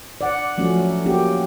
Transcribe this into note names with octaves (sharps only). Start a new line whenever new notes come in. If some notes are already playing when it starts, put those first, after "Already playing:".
D5 F#5
F3 F#3 A3 C#4
A#3 C#4 F#4 G4